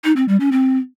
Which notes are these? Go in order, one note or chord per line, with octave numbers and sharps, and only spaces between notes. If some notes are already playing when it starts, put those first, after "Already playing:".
D#4
C4
G3
C#4
C4